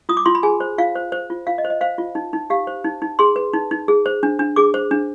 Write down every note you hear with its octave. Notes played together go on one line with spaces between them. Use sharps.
F4 D#6
D6
F4 C6
B5
G#4 G#5
C5
F4 F5
C5
C5
F4
F4 F5
D#5
C5
D#5
C5 F5
F4
D#4
D#4
G4 F5
C5
D#4
D#4
G#4 C6
B4
D#4
D#4
G#4
C5
D4
D4
G#4 D6
C5
D4